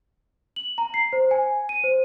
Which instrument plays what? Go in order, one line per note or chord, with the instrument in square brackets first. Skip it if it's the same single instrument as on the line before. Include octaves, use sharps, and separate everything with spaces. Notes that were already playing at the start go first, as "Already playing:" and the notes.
[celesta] F#7
A#5
C7
C5
G#5
D#7
C5